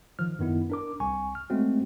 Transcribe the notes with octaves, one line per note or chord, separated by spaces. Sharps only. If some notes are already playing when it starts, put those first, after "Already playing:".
D#3 F3 F6
F#2 D#3 B3 E4
D4 A#4 D6
C2 G#5 C#6
F6
G#3 A3 C4 C#4 F#4